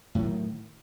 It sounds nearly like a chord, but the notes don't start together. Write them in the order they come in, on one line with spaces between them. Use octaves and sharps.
A2 F#3 D#3